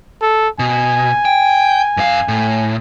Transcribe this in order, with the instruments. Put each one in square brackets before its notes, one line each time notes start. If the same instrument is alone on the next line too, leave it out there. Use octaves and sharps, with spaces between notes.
[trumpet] A4
[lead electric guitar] B2 [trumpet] G#5
[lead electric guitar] G5
F#2 F5
A2